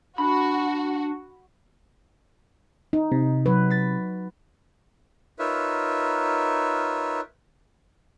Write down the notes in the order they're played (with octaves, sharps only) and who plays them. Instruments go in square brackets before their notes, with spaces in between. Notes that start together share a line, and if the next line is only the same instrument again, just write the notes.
[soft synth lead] D4 [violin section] F#4 [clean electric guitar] B5
[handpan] D#4
[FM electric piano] C3
[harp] F#3 [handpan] B4
[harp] A6 B6
[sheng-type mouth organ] D#4 F4 A#4 B4 C#5 E5